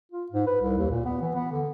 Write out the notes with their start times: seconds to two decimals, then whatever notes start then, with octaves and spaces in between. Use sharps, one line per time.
0.11 F4
0.32 G#2
0.47 B4
0.61 C2
0.78 D#2
0.91 A#2
1.05 B3
1.21 E3
1.35 B3
1.51 D3